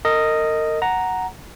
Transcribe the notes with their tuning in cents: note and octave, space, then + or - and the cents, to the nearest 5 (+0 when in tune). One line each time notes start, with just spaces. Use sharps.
A#4 -35 D#5 +0
F#5 +0 A#5 +0